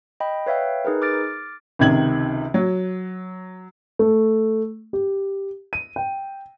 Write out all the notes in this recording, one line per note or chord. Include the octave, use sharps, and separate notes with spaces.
D#5 G5 B5
B4 C#5 E5 F5 G5
D#4 G#4 A#4 B4
D6 F6 A6 D7
C#2 C3 D#3 G#6 F#7
F#3
A3
G4
D#7
G5